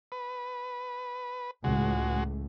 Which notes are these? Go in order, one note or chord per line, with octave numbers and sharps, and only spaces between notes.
B4
C#2 A2 G#3 F#4